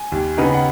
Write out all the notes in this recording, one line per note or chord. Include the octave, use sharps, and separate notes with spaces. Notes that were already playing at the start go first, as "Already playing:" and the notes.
Already playing: G#5
D#2
C#3 B3 D#4
F#5